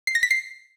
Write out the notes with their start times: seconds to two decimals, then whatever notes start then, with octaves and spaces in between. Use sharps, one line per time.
0.07 C7
0.15 A#6
0.23 B6
0.31 C7